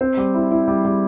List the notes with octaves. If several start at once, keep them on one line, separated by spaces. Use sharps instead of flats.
C4 C5
G3
E4
E4
G3
G3